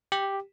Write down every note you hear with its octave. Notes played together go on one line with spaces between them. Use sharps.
G4